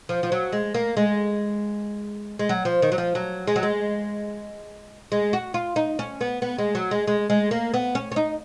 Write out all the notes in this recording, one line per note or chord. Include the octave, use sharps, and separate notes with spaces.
F3
F3
F#3
G#3
A#3
G#3
G#3
F#3
F3
D#3
F#3
F3
F#3
G#3
F#3
G#3
G#3
F#4
F4
D#4
C#4
B3
B3
G#3
F#3
G#3
G#3
G#3
A#3
B3
C#4
C#4
D#4